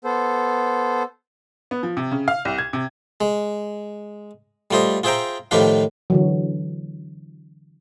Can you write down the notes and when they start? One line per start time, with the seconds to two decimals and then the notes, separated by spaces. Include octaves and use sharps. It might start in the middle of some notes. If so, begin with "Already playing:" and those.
0.04 B3 A4 C5
1.71 B3
1.83 F3
1.97 C3
2.11 C#3
2.28 F5
2.45 C2
2.58 G#6
2.73 C3
3.21 G#3
4.71 G3 A3 F4 C5 D#5
5.04 F4 G#4 C5 E5 G5 A#5
5.51 A2 D#3 F3 G4 B4 F5
6.10 D3 E3 F#3